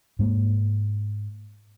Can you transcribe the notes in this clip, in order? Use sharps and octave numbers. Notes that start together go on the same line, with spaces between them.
G#2 G#3 A#3